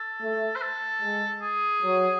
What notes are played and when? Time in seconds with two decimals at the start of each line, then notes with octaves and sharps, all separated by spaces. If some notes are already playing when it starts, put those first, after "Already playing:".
Already playing: A4
0.21 A3
0.56 C5
0.62 A4
1.01 G#3
1.42 G#4
1.83 F#3